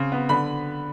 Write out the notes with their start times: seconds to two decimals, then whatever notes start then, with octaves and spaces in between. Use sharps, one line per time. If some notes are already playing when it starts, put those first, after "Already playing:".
Already playing: C#3 C4
0.12 B3
0.29 D3 B5